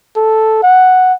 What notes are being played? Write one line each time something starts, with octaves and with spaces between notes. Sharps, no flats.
A4
F#5